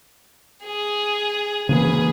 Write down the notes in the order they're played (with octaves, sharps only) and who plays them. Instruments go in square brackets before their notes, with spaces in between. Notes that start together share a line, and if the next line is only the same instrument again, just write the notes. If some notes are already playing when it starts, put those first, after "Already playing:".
[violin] G#4
[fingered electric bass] C#3 E3 A#3 [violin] G#4 B4